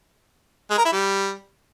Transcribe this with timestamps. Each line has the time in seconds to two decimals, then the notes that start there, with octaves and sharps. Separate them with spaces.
0.71 G#3
0.78 A#4
0.85 E4
0.92 G3